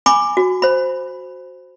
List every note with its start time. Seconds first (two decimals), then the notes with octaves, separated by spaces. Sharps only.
0.06 G#5 B5 C#6 D6
0.37 F#4
0.62 C5 B5